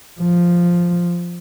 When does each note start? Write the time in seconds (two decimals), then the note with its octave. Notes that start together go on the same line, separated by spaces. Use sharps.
0.21 F3